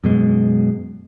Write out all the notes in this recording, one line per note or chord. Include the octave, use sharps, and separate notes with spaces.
F#2 B2 G#3